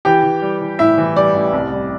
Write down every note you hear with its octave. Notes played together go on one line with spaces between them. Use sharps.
E3 G4 G5
E3
G3
E3
A2 E4 E5
E3
G3 D5
A1
C2
G3